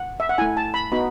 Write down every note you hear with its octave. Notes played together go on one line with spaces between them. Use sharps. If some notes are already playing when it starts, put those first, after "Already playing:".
Already playing: F#5
E5
F#5
A3 E4 G#5
A5
B5
B3 D#4 F#4 B5